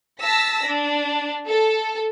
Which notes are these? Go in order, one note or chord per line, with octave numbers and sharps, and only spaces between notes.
A5 E6 A#6 B6
D4
A4